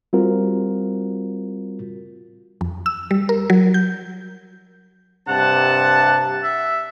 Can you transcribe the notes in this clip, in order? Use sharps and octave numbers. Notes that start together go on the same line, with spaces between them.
G3 C4 F4 F#4 A#4
F2
E6
G3
A#4
F#3
G6
G2 C3 F#5 A5
E5